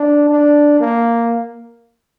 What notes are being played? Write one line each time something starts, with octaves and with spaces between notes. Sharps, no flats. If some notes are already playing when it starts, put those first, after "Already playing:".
Already playing: D4
D4
A#3